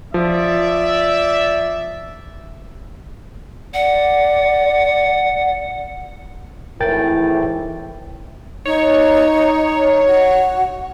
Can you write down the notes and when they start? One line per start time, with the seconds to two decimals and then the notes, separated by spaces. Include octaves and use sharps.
0.14 F3 D5 E5
3.74 D5 F#5
6.80 G#1 A2 E3 A#4 G5 A6
8.65 D#4 C#5
10.06 F#4